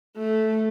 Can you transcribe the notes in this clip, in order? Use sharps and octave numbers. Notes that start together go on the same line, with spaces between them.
A3